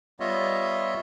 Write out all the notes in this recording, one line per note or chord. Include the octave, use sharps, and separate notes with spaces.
G3 B3 F4 C#5 D#5 E5